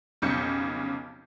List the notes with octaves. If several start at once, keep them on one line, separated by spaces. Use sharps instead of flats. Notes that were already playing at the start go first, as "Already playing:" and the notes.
F1 B1 C#3 G6 C#7